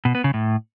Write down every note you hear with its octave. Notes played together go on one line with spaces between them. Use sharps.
B2
B3
C#3
A2